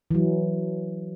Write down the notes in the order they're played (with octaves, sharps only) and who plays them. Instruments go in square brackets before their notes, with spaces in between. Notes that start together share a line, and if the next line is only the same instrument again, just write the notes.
[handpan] E3 F#3